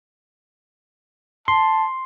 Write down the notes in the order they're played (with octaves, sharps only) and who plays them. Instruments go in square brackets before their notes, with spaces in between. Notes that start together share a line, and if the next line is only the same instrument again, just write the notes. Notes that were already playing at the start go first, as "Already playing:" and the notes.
[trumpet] A5 [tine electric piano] C6